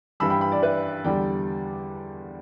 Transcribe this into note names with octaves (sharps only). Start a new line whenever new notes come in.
G2 E3 G3 B5 E6
G5 B5
G5 B5
D5
B4 E5
E2 D3 G3 D5 G5